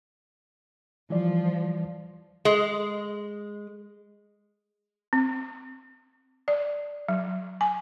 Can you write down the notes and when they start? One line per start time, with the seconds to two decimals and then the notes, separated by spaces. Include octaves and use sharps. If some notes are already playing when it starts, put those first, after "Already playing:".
1.10 E3 F3 G3 D5
2.45 G#3
5.13 C4
6.48 D5
7.08 F#3
7.61 G#5